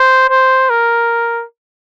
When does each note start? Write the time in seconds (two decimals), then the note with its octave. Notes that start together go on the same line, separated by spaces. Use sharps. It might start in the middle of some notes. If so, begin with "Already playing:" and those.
Already playing: C5
0.30 C5
0.70 A#4